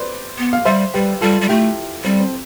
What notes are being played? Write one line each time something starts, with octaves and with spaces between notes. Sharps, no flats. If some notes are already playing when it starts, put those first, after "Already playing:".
Already playing: B4 C5 D5
B3
F5
G3 C5 E5
G3 G4 B4
G3 F4 A4
G3
A3 E4 G4
G3 C4
C4